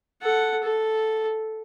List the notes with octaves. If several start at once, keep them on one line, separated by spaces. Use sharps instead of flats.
A4 F#5
A4